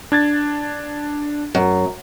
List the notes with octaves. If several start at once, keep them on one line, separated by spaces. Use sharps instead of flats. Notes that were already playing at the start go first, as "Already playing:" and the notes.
D4 G#6 A6
F#2